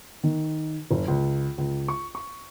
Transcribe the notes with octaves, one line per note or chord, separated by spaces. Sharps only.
D#3
F#1
C#2
C#2
C#6
C#6